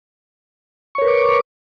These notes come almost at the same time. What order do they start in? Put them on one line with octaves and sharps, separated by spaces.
C#6 C#5 A#4 B4 D6